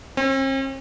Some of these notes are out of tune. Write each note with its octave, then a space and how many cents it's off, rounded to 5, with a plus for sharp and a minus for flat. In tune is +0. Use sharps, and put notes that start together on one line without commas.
C4 +45